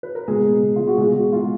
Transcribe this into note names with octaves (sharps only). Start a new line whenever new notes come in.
B4
A#4
B2 G#3 G#4
B2
B2
G#3 F4
F#4
B2 G#3 G#4
G#3 F#4
G#3 F4